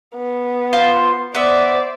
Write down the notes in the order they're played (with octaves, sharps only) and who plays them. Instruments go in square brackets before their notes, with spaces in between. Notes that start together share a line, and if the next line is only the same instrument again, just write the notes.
[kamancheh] B3
[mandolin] F4 C5 C6
[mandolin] B3 E5 [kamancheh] C5 D5